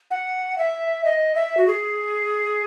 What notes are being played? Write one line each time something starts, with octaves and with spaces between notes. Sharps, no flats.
F#5
E5
D#5
E5
F#4
G#4